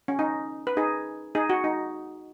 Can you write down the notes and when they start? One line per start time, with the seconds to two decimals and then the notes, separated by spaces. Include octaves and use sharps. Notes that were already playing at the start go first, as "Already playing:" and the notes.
0.08 C#4
0.19 D#4
0.67 B4
0.77 D#4 G#4
1.35 D#4 G#4
1.50 F#4
1.64 D#4